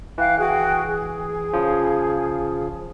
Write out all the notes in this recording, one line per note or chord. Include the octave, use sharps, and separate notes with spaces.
E3 F5 G5 F#6
F#4 G#4 G5
G#4
C#3 F3